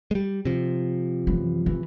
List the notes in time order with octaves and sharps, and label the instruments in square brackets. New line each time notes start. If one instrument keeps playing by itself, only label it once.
[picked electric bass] G3 G#3
C3 F3
[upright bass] F#2 E3
E3